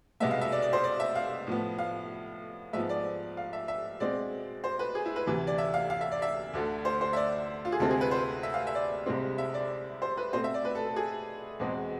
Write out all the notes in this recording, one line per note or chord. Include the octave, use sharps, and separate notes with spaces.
C2 B2 G#3 B3 E5
F5
E5
D5
D5
C5
D5
E5
F5
A2 F3 B3
F5
G#2 F3 B3 E5
D5
F5
E5
E5
B2 G#3 C4 D5
C5
B4
G#4
E4
B4
D2 C3 E3
D5
E5
F5
F5
E5
D5
E5
D2 D3 A3
C5
C5
E5
D5
F4
G#4
D2 C3 G#3 C4 A4
G#4
B4
C5
E5
F5
E5
D5
C2 C3 G#3 C4
E5
D5
C5
B4
B2 A3 C4 C5
E5
D5
B4
A4
A4
G#4
E2 B2 G#3 C4